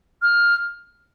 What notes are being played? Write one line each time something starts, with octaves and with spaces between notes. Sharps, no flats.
F6